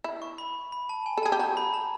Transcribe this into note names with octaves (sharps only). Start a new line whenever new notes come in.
E4
C#6
B5
B5
A5
G#5
A4
G#4 A5
G4
F#4 A#5
B5
A#5